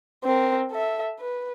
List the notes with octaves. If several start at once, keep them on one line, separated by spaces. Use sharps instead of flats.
C4 A#4
A4 E5
B4